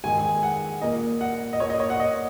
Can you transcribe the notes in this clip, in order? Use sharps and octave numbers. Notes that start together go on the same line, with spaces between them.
G#2 D#3 G#3 G#5
G#5
F#5
A#2 A#3 D#5
F#5
D#5
A#2 A#3 C#5
D#5
C#5
F#5
D#5